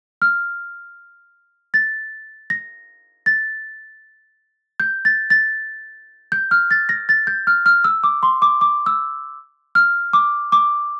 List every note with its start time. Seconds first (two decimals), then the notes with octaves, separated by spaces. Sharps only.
0.22 F6
1.74 A6
2.50 A#6
3.26 A6
4.80 G6
5.05 A6
5.30 A6
6.32 G6
6.51 F6
6.71 A6
6.89 A#6
7.09 A6
7.27 G6
7.47 F6
7.66 F6
7.84 E6
8.04 D6
8.23 C6
8.42 D6
8.61 D6
8.86 E6
9.75 F6
10.13 D6
10.52 D6